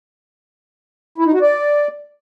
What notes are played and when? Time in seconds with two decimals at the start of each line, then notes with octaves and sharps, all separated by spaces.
1.18 E4
1.26 D#4
1.34 F#4
1.41 D5